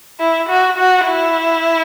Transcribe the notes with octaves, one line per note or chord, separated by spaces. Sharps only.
E4
F#4
F#4
E4